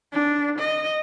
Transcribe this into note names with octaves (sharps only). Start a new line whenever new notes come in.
D4
D#5